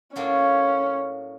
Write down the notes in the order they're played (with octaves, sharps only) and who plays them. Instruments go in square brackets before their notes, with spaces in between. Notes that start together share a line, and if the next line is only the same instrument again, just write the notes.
[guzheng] A2 F#3 A#3 D4 F4 [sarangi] C#4